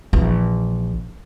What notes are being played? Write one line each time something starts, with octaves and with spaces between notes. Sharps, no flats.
A#1 E3